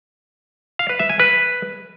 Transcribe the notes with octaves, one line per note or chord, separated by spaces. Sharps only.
F5
B4
E5
G#5
B4